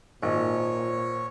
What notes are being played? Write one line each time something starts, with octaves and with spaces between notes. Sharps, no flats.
G#1 A#2 C5 C#5